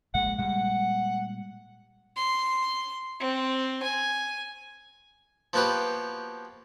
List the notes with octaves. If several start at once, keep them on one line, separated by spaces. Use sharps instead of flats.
A#1 A#2 G#3 F#5
A#2 G3 G#3 F#5
C6
C4
G#5
F3 A#3 B3 F#4 G4 B4